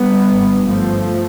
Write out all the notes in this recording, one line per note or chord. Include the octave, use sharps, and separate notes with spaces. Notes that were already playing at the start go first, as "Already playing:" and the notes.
Already playing: G3 B3
G1 G2
F3 A3